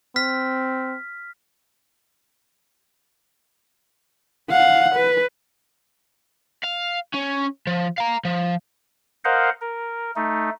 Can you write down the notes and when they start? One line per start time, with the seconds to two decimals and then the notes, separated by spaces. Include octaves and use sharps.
0.16 C4 F6 B6
4.50 F5 F#5
4.95 B4
6.64 F5
7.14 C#4
7.67 F3
7.98 F5 A#5
8.25 F3
9.25 A#4 C5 D#5 F5 F#5
9.61 A#4
10.16 A3 D#4